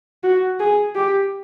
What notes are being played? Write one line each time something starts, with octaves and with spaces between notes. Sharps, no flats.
F#4
G#4
G4